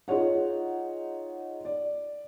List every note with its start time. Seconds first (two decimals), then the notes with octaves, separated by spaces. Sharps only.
0.08 D#4 F4 G#4 C#5 F#5
1.65 D5